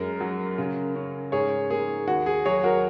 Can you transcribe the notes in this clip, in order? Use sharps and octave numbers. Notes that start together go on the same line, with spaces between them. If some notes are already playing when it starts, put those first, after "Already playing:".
Already playing: F#2 G#3 A#4
F#3
C#3
C#4
G#2 G#4 C#5
A#3 G#4
D#2 F#4
G#4
F#3 G#4 C#5
F#4 A#4